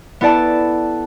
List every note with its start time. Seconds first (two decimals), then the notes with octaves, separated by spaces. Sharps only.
0.21 B3 E4 A4 D5 A5